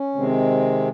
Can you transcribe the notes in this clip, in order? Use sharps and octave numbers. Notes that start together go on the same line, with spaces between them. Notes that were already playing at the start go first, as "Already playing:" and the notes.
Already playing: C#4
C3 D#3 G#3 C4